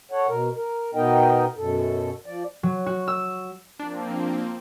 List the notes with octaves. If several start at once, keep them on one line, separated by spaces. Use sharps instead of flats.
A4 C#5 F#5
B2 A#4
A#4
B2 B3 D#4 A#4 D#5 G5
F#2 B2 A4
F3 D5
F#3
F#4
E6
F3 A#3 C4 D4